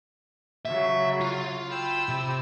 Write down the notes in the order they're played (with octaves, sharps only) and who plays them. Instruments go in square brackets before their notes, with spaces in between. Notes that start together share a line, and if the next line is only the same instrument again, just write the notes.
[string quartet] C#3 F#3 [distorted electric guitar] E5
[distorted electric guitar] F4
[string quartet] G5 B5 E6
[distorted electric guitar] C3